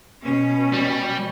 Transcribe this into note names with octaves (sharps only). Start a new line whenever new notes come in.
B2 C#4
G3